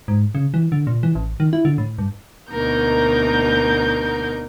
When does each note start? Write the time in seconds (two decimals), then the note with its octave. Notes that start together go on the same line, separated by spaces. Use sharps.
0.08 G#2
0.35 C#3
0.54 E3
0.72 D3
0.87 A#2
1.03 E3
1.15 A1
1.40 D#3
1.53 E4
1.65 D3
1.78 A2
1.98 G2
2.50 D2 B2 A#3 D#4 A#4 G6